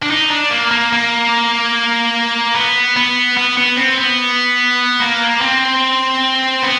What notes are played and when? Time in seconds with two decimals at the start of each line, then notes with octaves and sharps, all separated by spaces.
0.03 D4
0.11 D#4
0.31 D4
0.51 A#3
0.71 A#3
0.92 A#3
2.54 B3
2.96 B3
3.37 B3
3.58 B3
3.77 C4
3.97 B3
5.00 A#3
5.41 C4
6.63 B3